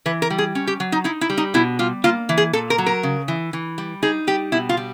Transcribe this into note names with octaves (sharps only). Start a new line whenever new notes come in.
E3 B4
A#4
G3
G#4
C#4
G4
F#3
D#4
D#4 E4
E4
G3
D#4
B2 E4
G3 F4
A#3 F4
E3
G#4
A#2 A4
A#4
F#3
A#4
C#3
E3
E3
G3
D#4 G#4
G3 G4
B2 E4
F4
G3